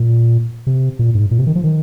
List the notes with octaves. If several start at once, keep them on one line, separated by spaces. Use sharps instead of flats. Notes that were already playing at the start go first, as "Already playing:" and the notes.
Already playing: A#2
C3
A#2
G#2
A#2
C3
D#3
F3
D#3